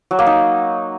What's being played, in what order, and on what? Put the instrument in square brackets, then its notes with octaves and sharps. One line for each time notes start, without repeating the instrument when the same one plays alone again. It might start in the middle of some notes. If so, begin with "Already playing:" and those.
[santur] F#3
A#3
D#4